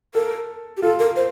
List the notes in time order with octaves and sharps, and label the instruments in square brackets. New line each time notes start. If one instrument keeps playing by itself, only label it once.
[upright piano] A4 [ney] A#4
[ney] G4
[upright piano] F4 [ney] A4
[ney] A#4
C5